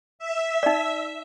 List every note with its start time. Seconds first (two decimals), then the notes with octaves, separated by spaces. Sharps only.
0.19 E5
0.63 D#4 D5